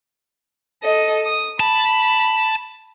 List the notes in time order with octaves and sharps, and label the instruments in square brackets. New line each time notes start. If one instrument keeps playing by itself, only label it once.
[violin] A4 D#5
D#6
[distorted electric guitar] A5 [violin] B5